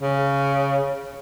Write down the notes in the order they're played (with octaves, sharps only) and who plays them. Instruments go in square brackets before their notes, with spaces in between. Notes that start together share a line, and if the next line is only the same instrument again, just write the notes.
[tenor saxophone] C#3